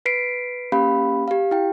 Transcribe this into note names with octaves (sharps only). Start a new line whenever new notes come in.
B4 B6 C7 D7
A#3 C#4 G4 F5 B5
G4 F5
E4 G5